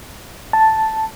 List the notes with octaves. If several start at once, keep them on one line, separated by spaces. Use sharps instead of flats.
A5